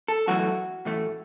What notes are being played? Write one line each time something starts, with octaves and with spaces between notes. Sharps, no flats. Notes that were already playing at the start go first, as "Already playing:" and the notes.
A4
F#2 E3 A3 F#4
A2 E3 A3